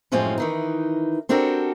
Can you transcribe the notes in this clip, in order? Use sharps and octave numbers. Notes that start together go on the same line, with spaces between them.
F#2 A2 F3 G#3 C4 C#4
D#3 E3 D#4
C4 D4 F#4 G4 A4 A#4